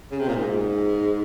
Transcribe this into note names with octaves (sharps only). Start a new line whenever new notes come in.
C#3
C3
A#2
G#2